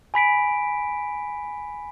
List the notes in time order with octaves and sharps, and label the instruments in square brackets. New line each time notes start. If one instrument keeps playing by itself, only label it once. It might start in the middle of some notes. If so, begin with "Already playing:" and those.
[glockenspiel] G#5 B5 B6 D7